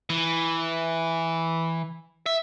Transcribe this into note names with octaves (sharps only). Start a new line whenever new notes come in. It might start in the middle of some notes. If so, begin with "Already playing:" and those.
E3
E5